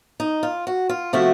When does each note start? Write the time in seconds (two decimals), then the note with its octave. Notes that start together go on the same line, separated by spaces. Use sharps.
0.20 D#4
0.43 F4
0.67 F#4
0.89 F4
1.13 C3 F3 A3 F#4